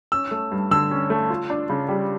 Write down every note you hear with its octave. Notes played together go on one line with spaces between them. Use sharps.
C#4 E6
A3
G2
D3 E6
C#4
A3
F4
D4
C#3
G3